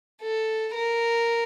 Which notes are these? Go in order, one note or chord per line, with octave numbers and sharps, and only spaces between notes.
A4
A#4